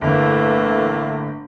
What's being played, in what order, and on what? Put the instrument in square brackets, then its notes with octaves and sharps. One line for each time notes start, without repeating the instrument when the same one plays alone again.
[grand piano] G1 [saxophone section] A2 A3 A#3 [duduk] E3